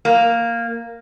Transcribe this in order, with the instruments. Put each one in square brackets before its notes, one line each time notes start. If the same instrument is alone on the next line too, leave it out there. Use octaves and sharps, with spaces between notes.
[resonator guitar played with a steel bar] A#3